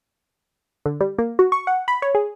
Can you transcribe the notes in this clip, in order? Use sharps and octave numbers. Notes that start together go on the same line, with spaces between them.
D3
G3
A#3
F#4
C#6
F#5
B5
C#5
G#4